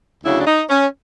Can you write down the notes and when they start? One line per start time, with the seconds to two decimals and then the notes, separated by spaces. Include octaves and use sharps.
0.24 D2 C#3 F#3 E4
0.39 D4
0.47 D#4
0.70 C#4